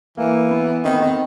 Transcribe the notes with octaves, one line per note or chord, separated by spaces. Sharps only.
E3 A#3
B3
D#3 C4
B3
D#3 C4